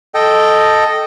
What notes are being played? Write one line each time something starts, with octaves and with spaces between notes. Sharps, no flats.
A4 D#5 G5